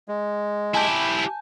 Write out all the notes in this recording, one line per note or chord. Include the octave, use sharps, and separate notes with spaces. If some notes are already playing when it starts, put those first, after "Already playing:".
G#3
E4 G4 G#5 A5 G6